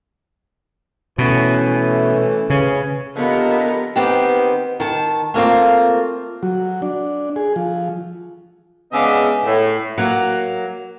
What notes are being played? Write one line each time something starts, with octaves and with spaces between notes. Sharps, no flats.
B2 E3 A3 C#4
C#3 C#4 B4
D3 F3 A#3 B3 G4 A#4 D#5
D#3 B3 C4 G4
D#3 A5
A3 A#3 C4 F4
F#3
D4
G#4
F3
C#3 G#3 B3 D4 D#5 E5
A2
F#3 A#3 A#4